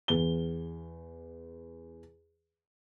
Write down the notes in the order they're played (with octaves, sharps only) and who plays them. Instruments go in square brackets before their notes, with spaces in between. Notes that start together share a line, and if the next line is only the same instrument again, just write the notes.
[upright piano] E2 G7